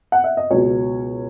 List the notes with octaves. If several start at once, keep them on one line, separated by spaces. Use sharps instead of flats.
F#5
E5
D#5
C#2 B2 F#3 C#5